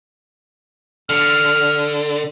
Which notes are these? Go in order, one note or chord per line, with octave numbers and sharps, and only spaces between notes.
D3 F6